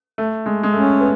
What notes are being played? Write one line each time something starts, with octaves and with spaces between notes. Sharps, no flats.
A3
G#3
G#3
A3 C#4
B3